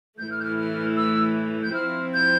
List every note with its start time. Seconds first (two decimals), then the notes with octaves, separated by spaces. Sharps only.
0.18 A2 E3 A3 G6
0.31 F6
0.40 G6
0.44 F6
0.57 F6
0.97 E6
1.63 G6
1.74 F3 C4 E4 F6
2.14 G6